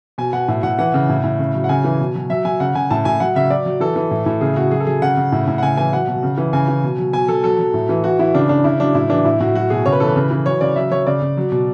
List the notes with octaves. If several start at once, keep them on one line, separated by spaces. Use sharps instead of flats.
B2 G#5
B2 F#5
A2
A2 F#5
E3 F#5
C#3
A2
A2
C#3
F#3
F#5
C#3 G#5
E3
B2
F#3
F#3 E5
F#3 G#5
C#3 F#5
C#3 G#5
A2 A5
A2 G#5
F#3 F#5
C#3 E5
F#3 D5
F#3
E3 A4
E3
A2
A2
C#3 G#4
C#3 F#4
F#3 G#4
A4
F#3 G#4
C#3 F#5
C#3
A2
A2
F#5
C#3 G#5
E3 G#5
F#3 F#5
B2
C#3
E3
C#3 G#5
E3
B2
F#3
B2 G#5
F#3 A4
F#3 A4
F#3
A2
E3
E3 F#4
E3 E4
C#3 D4
C#3 D4
C#3 E4
F#3 D4
A2 E4
E3 D4
A2 E4
A2 F#4
F#3 F#4
B2 G#4
C#3 C#5
B4
E3 A4
B4
C#3
E3
F#3 C#5
C#3 D5
F#3 E5
F#3 C#5
C#3 D5
C#3
F#3
B2